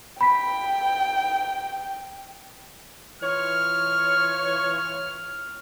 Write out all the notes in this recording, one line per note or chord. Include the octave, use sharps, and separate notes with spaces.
G5 B5 B6
E3 F4 C#5 F6